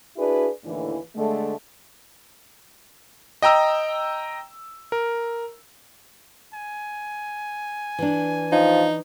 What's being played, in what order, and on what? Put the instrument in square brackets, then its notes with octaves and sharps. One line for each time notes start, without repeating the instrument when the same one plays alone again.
[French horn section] D4 E4 F#4 G#4 B4
D#2 A2 D3 E3
D3 G#3 A3
[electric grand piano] D#5 G5 A#5 E6
A#4
[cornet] G#5
[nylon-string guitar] E3 D4
[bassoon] F3 [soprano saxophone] D#4